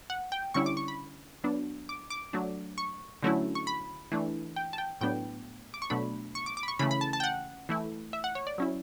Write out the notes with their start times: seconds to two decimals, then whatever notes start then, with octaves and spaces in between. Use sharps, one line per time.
0.10 F#5
0.32 G5
0.54 D3 G3 C#4 E4 C#6
0.66 D6
0.77 C#6
0.88 B5
1.44 F#3 B3 D4
1.89 D6
2.10 D6
2.33 F#3 A3 D4
2.78 C#6
3.23 D3 F#3 A3 C#4 E4
3.55 C#6
3.67 B5
4.12 E3 A3 D4
4.56 G5
4.73 A5
4.78 G5
5.01 A2 F#3 B3 D4 G5
5.74 D6
5.82 C#6
5.90 B2 F#3 A3 D4 B5
6.35 C#6
6.46 D6
6.57 D6
6.63 B5
6.68 C#6
6.79 C#3 E3 A3 B5
6.91 B5
7.01 A5
7.13 A5
7.20 G5
7.24 F#5
7.69 E3 A3 E4
8.13 E5
8.24 F#5
8.35 C#5
8.47 D5
8.58 F#3 C#4 E4